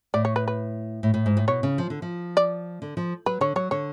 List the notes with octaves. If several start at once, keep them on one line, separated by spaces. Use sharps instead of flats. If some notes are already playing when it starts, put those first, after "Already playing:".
A2 D5
C#5
B4
B4
A2
A2
G#2
A2
B2 C#5
C#3
F3
D3
F3
D5
D3
F3
F#3 B4
D3 C#5
F#3 C#5
D3 C#5